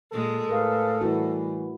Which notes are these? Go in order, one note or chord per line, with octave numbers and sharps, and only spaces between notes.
A#2 G#3 A4
A2 G#4 A#4 B4 F5
E3 G3 E4 F#4